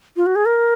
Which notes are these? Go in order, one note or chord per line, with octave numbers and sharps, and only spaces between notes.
F4
F#4
G#4
A#4